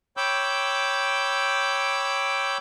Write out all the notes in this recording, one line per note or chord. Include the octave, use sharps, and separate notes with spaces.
C#5 G5 B5 D6 E6 G6